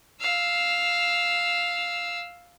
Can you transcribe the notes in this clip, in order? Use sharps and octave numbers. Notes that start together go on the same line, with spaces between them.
F5 E6